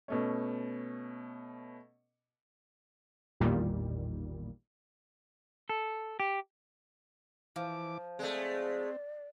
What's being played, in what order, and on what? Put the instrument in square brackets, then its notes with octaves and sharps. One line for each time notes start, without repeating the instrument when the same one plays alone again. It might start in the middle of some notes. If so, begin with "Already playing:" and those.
[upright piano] B2 A3 C#4
[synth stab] A1 E2 A#2 D#3 G3
[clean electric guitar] A4
G4
[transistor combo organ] E3 D6 [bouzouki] F3
[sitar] G#3 A3 [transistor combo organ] C4 [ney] D5